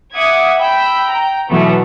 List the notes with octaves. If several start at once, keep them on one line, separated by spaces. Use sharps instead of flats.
E5 F#5 D6 D#6 G#6
G5 B5 E6
G5 A#5
B2 E3 F#3 A3 B3